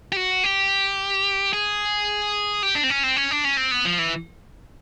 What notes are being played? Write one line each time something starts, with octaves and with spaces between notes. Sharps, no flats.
G4
F#4
G4
G#4
G4
D4
C4
C#4
C4
C#4
D4
C#4
C4
B3
F3
E3